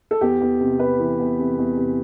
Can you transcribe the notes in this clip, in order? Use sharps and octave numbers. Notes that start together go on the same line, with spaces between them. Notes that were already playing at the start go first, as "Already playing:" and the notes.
A4
E2 G4
E2
C3
C3 B4
E3
E2
C3
E2
C3